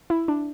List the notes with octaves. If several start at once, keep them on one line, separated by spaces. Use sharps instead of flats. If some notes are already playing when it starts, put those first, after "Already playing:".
E4
D4